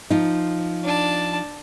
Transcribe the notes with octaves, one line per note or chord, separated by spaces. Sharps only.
F3 D#4
D4 A5